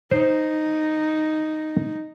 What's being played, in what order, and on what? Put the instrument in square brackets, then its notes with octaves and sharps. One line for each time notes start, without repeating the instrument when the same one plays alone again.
[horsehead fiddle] D#4 [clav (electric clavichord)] C5